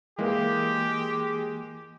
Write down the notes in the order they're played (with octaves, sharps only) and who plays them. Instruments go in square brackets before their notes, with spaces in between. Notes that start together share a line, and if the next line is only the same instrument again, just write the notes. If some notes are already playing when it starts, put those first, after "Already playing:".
[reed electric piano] E3 A#3 [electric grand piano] G#3 [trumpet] G4